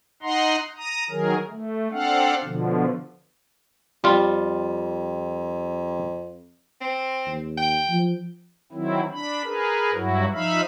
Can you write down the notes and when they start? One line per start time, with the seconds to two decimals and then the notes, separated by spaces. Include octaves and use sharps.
0.22 D#4 D#5 F#5 A#5 C6
0.77 A#5 D#6
1.10 D#3 F#3 G#4 A#4
1.50 A3
1.92 C4 D4 A4 F5 F#5
2.44 B2 D3 F3
4.04 F2 G3 F4
6.81 C4
7.26 D#2
7.58 G5
7.89 F3
8.72 D#3 F#3 C4 E4
9.12 D4 B5
9.44 G#4 A#4 B4
9.93 G2 F#3 E4 F#4
10.32 F3 D#4 E5 F5 B5